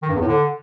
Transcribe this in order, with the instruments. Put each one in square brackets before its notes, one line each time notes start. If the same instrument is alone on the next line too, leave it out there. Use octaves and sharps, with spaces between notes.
[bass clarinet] D#3
G2
E2
A2
D3